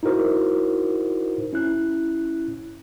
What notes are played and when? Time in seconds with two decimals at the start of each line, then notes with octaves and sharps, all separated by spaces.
0.03 D#4 E4 F#4 A#4 C5
1.53 C#4 E4 F#6